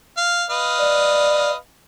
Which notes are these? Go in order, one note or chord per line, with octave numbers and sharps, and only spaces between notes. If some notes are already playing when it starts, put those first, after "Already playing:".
F5
B4 D#5 F5
D5